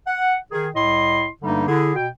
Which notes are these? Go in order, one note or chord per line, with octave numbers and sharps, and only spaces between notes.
F#5
D#3 G#4
C2 A2 E4 D#5 C6
G2 D3 G3 A3 A#3 D#4
D3 E4 G#4
B2 G5